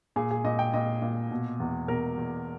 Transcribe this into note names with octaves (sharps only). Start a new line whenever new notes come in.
A#2 G#4
G#4
A#2 D#5
G5
A#2 D#5
A#2
B2
E2
B2 A#4
E2